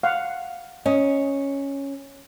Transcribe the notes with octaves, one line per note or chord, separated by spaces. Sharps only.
F5 F#5
C#4 D#5